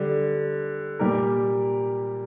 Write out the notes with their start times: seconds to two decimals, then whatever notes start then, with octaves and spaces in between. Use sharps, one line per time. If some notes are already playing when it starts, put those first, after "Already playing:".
Already playing: D3 G3
0.99 A#2 G3 A#3 G4 A#4